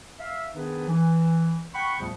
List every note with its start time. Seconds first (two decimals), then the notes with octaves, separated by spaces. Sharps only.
0.19 E5 F5
0.54 D#3 B3 D4 D#4 G#4 B4
0.88 E3
1.74 F#5 G5 B5 C#6
2.00 E2 A#2 C#3 F3 G3 A3